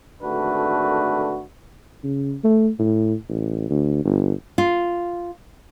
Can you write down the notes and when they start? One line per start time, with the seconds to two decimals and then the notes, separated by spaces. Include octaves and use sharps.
0.22 G#1 D3 A3 D4 F#4 B4
2.04 C#3
2.44 A3
2.79 A2
3.29 A1
3.70 D2
4.05 G1
4.58 F4